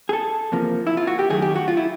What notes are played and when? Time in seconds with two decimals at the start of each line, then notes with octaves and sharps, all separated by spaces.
0.09 G#4
0.13 A4
0.52 E2 C3 F3 A#3
0.87 E4
0.97 F4
1.07 F#4
1.19 G4
1.29 F#2 D#3 F#3 A3 G#4
1.42 G4
1.56 F#4
1.68 F4
1.77 E4